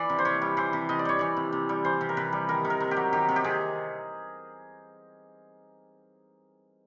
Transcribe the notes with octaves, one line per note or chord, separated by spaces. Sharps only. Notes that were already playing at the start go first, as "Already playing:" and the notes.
Already playing: E3 D5
C3
C5
C3 C#5
G3
E3 C5
C3
C3 D#5
D5
G3 C#5
E3 D5
C3
C3
G3
E3 C5
C3
A#4
C3 B4
G3
D#3 A#4
C3
A#4
C3
G4
F#3
D#3 G4
C3
G4
C3 G#4